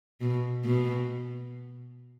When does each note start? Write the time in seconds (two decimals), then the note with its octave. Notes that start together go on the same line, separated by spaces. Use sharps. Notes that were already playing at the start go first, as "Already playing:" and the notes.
0.21 B2
0.65 B2